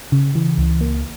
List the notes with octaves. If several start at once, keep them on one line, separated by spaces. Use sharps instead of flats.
C#3
E3
C#2
A#3